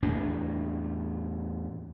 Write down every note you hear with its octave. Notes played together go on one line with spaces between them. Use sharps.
E2 A2 A#3 D4